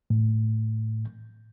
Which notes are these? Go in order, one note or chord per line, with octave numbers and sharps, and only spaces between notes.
A2